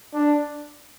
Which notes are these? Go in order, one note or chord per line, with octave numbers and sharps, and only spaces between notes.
D4